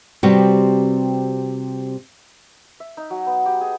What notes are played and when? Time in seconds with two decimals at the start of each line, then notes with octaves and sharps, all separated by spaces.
0.23 C3 G3 C4 F#4 G4 B4
2.80 E5
2.97 D#4
3.10 F#3
3.26 B3
3.46 G4
3.61 G#4